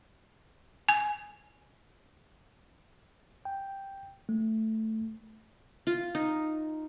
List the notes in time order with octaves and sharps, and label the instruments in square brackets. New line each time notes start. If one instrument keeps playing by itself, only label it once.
[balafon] G#5
[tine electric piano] G5
A3
[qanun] F4
D#4